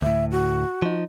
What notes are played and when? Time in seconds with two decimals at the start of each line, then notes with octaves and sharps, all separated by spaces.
0.02 D2 A2 E5
0.31 F#4
0.82 F3 D#4